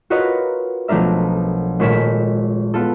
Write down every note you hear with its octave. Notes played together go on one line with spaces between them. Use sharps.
F4 F#4 A#4 B4 C#5 D#5
B1 F3 A3 D4 A#4 E5
G#1 A#2 A3 C#5 B6 E7
B3 F4 A4